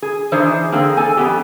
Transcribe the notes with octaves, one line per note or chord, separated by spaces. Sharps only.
G#4
E3 D4 D#4 G#4 C5
D3 A#3 C4 G#4
A4 G#5
F2 B3 G4